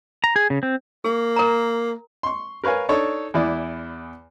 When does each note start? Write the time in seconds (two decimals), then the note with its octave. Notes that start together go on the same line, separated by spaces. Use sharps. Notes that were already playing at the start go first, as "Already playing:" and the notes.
0.24 A#5
0.36 G#4
0.50 C#3
0.63 C4
1.05 A#3 G#4
1.36 A#4 A#5
2.23 C6 C#6
2.64 A#4 B4 C#5 F5 G#5
2.89 D4 D#4 A4 C#5
3.34 E2 E3 E4 D5 D#6